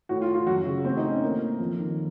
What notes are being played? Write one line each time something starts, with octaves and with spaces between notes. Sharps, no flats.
A2 F#4
F4
F4
F#2 F#4
C#3
A2 C4
D#4
C#4
A2 A#3
F2
D#3